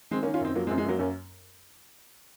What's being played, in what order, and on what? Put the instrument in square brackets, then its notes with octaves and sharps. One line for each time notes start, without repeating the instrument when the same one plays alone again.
[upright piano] D#3 G#3 C4
A#3 C#4
D#3
C#4 F4
F#2 C4 D#4
F3 F#3 A#3
G#3 C4
F#2
G#3
F#2 F#3 A#3
F#2 A#3 C#4